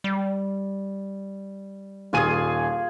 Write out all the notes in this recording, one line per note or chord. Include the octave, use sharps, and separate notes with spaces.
G3
D#1 F4 G#4 G#5 D#7